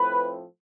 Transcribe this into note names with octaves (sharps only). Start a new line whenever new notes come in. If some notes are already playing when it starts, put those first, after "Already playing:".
Already playing: A2 F3 A3 C4 B4